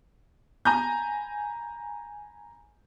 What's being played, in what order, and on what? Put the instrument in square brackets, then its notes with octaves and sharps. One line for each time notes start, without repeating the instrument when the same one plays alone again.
[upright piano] G#5 A#5 B5 G6